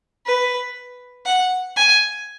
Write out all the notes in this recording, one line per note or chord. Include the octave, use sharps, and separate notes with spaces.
B4
F#5
G#5